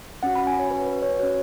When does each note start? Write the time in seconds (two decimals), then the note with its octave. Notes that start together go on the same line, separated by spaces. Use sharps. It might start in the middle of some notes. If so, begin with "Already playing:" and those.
0.23 C#4 F#4 F#5
0.35 B5
0.47 G#5
0.59 C#5
0.71 B4
0.86 B4
1.02 C#5
1.19 C#4 F#4 C#5